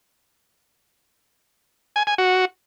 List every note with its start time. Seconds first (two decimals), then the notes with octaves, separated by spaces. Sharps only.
1.96 G#5
2.07 G#5
2.18 F#4